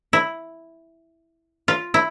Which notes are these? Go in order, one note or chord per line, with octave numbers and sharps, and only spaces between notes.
E4
F4
E4